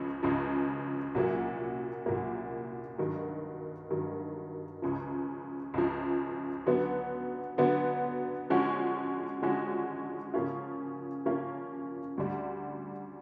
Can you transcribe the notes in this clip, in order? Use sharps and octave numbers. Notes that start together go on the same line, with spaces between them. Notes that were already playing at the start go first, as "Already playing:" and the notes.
Already playing: C#2 C#3 F3
C#2 C#3 F3
C2 A#2 F#3 A#3
C2 A#2 F#3 A#3
G2 D#3 F#3
G2 D#3 F#3
C#2 C#3 F3
C#2 C#3 F3
D3 F#3 B3
D3 F#3 B3
D3 F3 G#3 C#4 F#4
D3 F3 G#3 C#4 F#4
C#3 F3 A#3 C#4 F4
C#3 F3 A#3 C#4 F4
D2 D3 G3